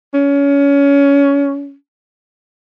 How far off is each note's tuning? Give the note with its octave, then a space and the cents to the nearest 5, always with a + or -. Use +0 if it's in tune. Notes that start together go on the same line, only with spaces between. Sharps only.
C#4 +25